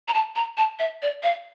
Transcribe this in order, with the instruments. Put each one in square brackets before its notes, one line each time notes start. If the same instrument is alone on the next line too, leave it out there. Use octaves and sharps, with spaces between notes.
[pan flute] A#5
A5
A#5
A5
E5
D5
F5